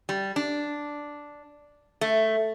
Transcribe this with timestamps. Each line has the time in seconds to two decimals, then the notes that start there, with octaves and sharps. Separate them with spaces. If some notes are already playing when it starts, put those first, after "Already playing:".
0.09 G3
0.36 D4
2.01 A3